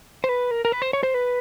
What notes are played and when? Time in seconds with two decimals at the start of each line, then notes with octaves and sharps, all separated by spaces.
0.24 C5
0.29 B4
0.51 A#4
0.65 A#4
0.72 B4
0.82 C5
0.93 C#5
1.03 C5
1.14 B4